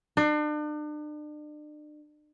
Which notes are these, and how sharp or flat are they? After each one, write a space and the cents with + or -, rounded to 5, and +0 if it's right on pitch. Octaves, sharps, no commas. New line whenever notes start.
D4 +40